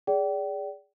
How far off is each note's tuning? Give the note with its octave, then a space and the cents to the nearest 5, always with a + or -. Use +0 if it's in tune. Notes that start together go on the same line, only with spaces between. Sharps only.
G#4 -10 D5 -25 G5 -35